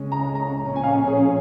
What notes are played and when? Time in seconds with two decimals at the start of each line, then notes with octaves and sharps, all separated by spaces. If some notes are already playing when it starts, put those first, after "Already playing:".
Already playing: C#2 C#3 G#3 C#4
0.12 A#5
0.35 A#5
0.59 A#2 F3 C#4
0.76 G#5
0.84 F5
1.08 G#4